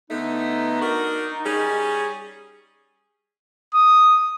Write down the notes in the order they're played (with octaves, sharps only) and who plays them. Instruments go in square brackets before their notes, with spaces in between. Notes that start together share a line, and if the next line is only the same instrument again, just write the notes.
[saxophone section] D3 A3 B3 [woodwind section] D#4
[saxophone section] D4 F#4 A#4
G3 C#4 G#4
[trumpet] D#6